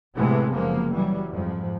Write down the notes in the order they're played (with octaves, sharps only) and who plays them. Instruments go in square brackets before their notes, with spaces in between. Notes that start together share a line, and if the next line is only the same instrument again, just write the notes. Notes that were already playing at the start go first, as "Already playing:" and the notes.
[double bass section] A2 C3 E3 G#3 A3 B3
F#1 F3 G#3 A#3 B3
E3 F#3 G3
F2 G#2 F3